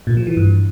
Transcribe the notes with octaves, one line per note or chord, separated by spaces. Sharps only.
A#2
F3
E3
G2